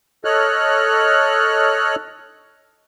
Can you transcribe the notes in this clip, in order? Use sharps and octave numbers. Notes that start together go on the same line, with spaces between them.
A4 C#5 D#5 F6 F#6